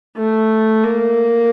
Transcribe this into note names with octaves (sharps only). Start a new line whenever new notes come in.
A3
A#3